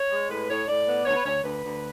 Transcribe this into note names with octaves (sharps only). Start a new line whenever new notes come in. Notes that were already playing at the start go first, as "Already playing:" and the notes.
Already playing: C#5
G#3
A2 B4
A2 C#5
A2 D5
B3
D2 C#5
B4
D2 C#5
D2 B4
D2